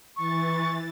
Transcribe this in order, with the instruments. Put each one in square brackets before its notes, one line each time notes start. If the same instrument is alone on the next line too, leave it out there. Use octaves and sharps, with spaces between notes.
[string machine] E3 A6 [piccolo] C#6